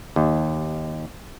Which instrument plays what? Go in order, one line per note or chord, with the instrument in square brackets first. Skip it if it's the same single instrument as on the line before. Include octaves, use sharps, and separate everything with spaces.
[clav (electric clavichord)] D#2